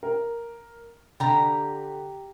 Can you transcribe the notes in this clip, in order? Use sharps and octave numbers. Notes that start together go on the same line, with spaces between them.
A#4
D3 G4 A#5